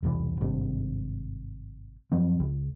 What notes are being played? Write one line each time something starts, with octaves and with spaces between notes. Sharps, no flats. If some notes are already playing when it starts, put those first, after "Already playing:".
E1 C2 A#2 E3
G#1 G2 C3
F#2 F3 F#3 C4
C#2